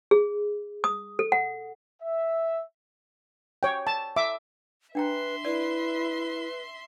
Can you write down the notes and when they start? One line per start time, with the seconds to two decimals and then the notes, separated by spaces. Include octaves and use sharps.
0.11 G#4
0.84 D#6
1.19 A4
1.32 F#5
2.02 E5
3.63 C#5 G5
3.87 A5
4.16 E5 D6
4.95 D4 B4 E5 G5 A#5 C6
5.45 E4 B4 D5